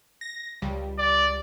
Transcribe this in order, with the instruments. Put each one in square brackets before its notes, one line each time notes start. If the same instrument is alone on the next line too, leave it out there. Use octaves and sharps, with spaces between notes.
[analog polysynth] A#6
C#2 G3
[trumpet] D5